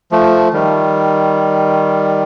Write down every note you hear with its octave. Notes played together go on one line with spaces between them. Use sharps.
F3 A3
D#3 G3